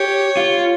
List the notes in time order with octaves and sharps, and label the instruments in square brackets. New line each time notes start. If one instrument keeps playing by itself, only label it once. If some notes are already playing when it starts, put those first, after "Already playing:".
Already playing: [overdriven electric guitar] G4 [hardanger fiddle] C#5
[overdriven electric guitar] F4